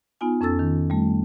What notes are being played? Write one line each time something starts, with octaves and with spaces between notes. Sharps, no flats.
B3 D#4 F4 G#5
F2 C#4 A4 E6 A6
D#3
G3 A3